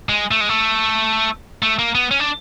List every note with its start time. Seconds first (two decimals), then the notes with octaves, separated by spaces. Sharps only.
0.09 G#3
0.31 A3
0.41 G#3
0.49 A3
1.63 A3
1.79 A#3
1.95 B3
2.11 C#4
2.20 D4